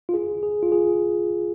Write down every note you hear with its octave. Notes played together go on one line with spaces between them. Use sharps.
F4
G#4
G#4
F4
G#4